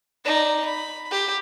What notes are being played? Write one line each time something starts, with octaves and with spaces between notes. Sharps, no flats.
D#4 D5
B5
G4